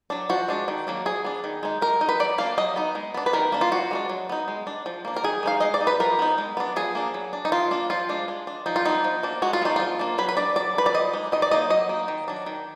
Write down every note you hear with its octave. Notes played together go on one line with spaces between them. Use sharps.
F#3 D4
F3 F#4
G#3 D4
D#3
F#3 A#3 D4
F3 G#4
B3 D4
D#3
G#3 D#4
G#3 A#4
D#4
B4
F#3 D5
A#3 D4 F5
F#3 D#5
B3 D#4
G#3
B3 D4
B4
D#3 A#4
A#3 D4
F4
F3 F#4
G#3 B3 D4
F#3
B3 D#4
G#3
D4
F3
A#3 D4
A#4
D#3 G#4
G#3 D#4 F5
G#3 D#5
D5
D#4
B4
F3 A#4
B3 D#4
G#3
B3 D4
F3 G#4
A#3 D4
F#3
D4
D#4
D#3 F4
A#3 D4
F3 F4
G#3 D4
G#3
D4
F3 D#4
F4
B3 D4 D#4
F3
A#3 D4
G#3 F#4
F4
B3 D4 D#4
F3 F4
A#3 D4
F#3 B4
B4
D4 D5
F#3 D5
D4 B4
D5
F3 D#5
G#3 D#4
D#3 D#5
D5
F#3 A#3 D#4 D#5
F#3 D#5
A#3 D#4
D#3
F#3 D4
D#3